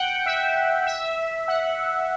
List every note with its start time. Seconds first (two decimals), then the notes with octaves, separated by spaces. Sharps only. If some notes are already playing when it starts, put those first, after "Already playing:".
Already playing: F#5 G5
0.26 E5
0.87 E5
1.48 F#5